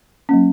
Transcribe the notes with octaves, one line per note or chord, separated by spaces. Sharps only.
F#3 A#3 C#4